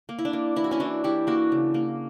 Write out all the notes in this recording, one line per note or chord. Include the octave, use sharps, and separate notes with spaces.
A#3
E4
D4
A#3
E3 E4
F#4
C#4 E4
E3 D4 F#4
E3 E4 G4
A#3 D4 F#4
C#3
A#3